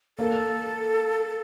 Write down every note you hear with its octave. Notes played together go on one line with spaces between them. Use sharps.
A#3 A4